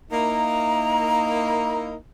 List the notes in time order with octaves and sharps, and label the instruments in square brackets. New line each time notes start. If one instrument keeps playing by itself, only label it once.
[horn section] A#3 D#4 E4 [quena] A#5